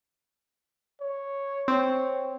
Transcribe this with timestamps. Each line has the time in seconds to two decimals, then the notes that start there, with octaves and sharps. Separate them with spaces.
1.01 C#5
1.68 C4 C#5